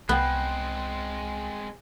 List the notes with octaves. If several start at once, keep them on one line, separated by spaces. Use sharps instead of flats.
C2 G#3 B3 C4 G5 F#6